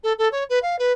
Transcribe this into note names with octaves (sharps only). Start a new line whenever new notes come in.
A4
A4
C#5
B4
F5
B4